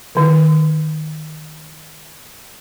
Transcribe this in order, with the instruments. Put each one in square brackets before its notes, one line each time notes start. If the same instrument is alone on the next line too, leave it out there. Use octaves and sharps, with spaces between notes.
[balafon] D3 D#3